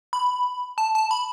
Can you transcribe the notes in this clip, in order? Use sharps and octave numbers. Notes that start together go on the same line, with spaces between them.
B5
A5
A5
B5